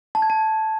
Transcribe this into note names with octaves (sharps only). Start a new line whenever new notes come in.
A5
G#6
A5